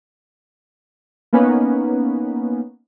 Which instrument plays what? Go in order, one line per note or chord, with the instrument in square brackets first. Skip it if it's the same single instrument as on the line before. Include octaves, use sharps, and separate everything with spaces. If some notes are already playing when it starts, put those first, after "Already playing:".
[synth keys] A#3 B3 C#4 D#4 B4